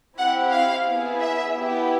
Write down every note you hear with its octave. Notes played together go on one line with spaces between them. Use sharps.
C4 E4 G4 F#5
F5
B3 E4 G#4
E5
B3 E4 G4